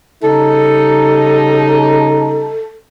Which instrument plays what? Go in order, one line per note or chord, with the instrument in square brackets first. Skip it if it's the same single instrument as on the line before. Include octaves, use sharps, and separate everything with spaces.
[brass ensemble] C#3 G3 D#4 [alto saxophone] A4